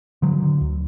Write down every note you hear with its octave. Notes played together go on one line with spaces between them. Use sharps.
D3 F#3
D3
D2